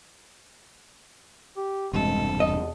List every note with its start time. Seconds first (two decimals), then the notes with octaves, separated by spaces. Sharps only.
1.57 G4
1.93 E1 G2 C3 G#3 A4
2.40 E2 D#5